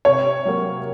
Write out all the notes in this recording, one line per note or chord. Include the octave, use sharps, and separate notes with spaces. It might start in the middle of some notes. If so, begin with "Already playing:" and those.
C3 C#5
F#3 A#3